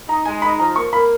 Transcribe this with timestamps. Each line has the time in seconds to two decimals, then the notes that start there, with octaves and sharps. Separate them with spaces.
0.09 D#4 A#5
0.25 G#3 G#5
0.42 D#4 B5
0.59 F3 A#5
0.76 A#3 C#6
0.92 A#3 B5